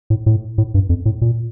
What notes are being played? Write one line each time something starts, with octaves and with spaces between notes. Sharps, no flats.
A2
A2
A2
G2
F2
A2
A#2